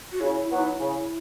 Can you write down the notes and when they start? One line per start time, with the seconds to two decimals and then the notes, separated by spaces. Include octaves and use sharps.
0.12 F#4
0.20 C#3 E4
0.50 F#3 B3 E4 F#4
0.58 D#4
0.68 E4
0.80 C#3